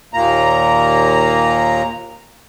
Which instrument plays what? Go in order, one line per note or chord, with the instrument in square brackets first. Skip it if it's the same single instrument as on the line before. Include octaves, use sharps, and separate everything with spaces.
[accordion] D#2 A#2 A#3 A#5